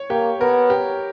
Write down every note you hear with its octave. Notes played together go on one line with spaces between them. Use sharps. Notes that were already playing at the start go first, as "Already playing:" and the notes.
Already playing: C#5
A#3 G4
B3 A#4
G4